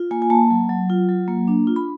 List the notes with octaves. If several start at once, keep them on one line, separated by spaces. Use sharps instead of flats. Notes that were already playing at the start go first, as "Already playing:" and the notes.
Already playing: F4
A#3 G#5
G#5
A#3 A5
F#3
F#3
F4
F#3
A#3
D4
F4
B5